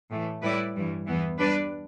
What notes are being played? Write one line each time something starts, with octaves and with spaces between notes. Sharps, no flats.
A2 E3 A3
A2 G3 E4 B4 D5
G2 E3 G3
E2 E3 B3
G3 D4 B4 D5